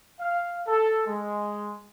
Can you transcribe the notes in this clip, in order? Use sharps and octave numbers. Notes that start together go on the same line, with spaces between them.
F5
A4
G#3